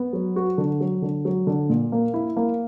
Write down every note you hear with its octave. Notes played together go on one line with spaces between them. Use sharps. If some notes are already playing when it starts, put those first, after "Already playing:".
Already playing: B3
F#3
F#4
D3
F#3
D3
F#3
D3
A#2
A#3
E4
A#3